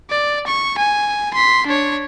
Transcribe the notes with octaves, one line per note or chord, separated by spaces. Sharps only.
D5
C#6
G#5
C6 B6
D4 C#5